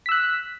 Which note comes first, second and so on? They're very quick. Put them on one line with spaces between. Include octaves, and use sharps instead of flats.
B6 E6 F#6